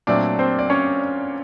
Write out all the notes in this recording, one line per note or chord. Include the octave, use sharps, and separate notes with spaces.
A#2 F#3 A3 C4 D4 D5
C4 C5
D5
C#4 C#5